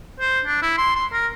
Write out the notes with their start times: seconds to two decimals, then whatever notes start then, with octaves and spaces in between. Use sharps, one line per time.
0.20 C5
0.45 D4
0.62 E4
0.78 C6
0.96 C6
1.13 A#4